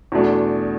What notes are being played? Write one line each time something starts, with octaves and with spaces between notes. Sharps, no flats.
E2 B2 A3 D4